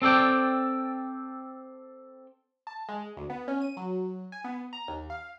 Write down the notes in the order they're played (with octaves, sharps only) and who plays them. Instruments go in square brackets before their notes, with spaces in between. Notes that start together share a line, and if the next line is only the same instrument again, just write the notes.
[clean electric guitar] C4 A4 D5 G5
[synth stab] A5
G#3
D2
B3
C#4
D#7
F#3
G#5
B3
A#5
D#2
F5